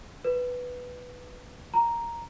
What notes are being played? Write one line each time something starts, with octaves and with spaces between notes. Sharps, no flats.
B4
A#5